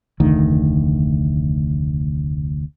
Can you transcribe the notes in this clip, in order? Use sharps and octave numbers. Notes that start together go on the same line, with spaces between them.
F1 D2 D#3